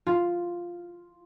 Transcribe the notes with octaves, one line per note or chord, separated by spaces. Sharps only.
F4